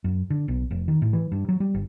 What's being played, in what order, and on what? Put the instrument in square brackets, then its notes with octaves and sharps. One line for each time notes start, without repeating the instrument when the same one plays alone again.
[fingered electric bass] F#2
D3
B1
F1
D#3
A2
E3
G2
F#3
G3
G1